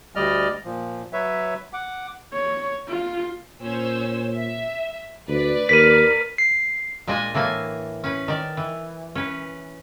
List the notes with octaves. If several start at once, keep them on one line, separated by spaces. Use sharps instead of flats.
D2 G3 D5 D#5 F6
A#2 F3
F#3 B4 C#5 E5
F#5 D6
C#5
F4
A#2 C#4 C5 E6
E5
D2 B4 D5
D#2 A#4 B6 D#7
C7
A#2 G#3 D4 D#5 G#5
A2 E3 A#3 G#5 A5
C#4 B4
D#3 D5
E3
C#4 B4